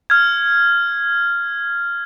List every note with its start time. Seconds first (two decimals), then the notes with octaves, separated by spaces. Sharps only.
0.10 F6 G#6